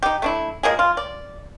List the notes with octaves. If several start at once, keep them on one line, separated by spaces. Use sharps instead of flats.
D#4 G4
A3 D4 E4
F3 G#3 A#3 G#4
F4
D5